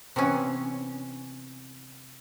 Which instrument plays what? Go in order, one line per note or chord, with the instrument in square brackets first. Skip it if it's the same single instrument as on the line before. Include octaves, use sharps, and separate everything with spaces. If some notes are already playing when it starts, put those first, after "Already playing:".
[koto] C3 E3 B3 C#4